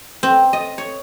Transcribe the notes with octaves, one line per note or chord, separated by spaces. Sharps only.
C4
D#5
C#5